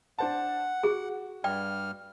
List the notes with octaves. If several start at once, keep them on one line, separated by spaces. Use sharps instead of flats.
D4 C5 F#5 A5
F#4 G#4
G2 G3 D5 G5 F6